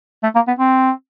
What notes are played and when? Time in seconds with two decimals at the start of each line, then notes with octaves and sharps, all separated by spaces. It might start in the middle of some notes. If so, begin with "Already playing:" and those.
0.23 A3
0.35 A#3
0.47 B3
0.59 C4